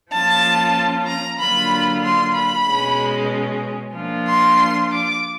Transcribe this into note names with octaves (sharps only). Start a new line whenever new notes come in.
F3 A#3 C#4 F4 A5
A#5
D3 F#3 A#3 D4 F4 B5
C6
B5
B2 G#3 C#4
F3 A#3 D4 F4
C6
D6